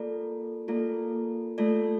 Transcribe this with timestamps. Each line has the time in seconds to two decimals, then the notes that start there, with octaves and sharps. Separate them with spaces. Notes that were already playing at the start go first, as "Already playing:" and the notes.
Already playing: A#3 F4 A4 D5
0.68 A#3 F4 A4 D5
1.58 A3 F4 A4 D5